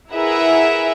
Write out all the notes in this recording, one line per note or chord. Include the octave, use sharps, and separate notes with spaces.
E4 G#4 A#4 B4 E5 F#5